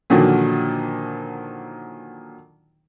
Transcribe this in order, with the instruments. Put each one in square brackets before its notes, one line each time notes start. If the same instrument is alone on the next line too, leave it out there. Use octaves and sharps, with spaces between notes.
[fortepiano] A#2 D3 D#3 F3 F#3